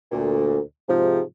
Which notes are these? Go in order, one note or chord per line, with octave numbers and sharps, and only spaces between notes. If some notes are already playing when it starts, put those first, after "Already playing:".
D2 A#2
G#2 C3 F3